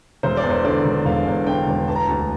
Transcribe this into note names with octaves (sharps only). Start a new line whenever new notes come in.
E1 C5
D5
E2
C5
D3 D5
E1
E1 F5
E2
D3 G5
E1
E3 A5
A#5
D2 A5